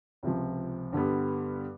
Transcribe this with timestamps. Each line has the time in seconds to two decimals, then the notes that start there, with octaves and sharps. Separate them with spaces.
0.23 C#2 C3 F3
0.93 G2 D3 G3 B3